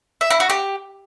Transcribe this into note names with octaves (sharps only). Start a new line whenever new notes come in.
E5
E4
F#4
G4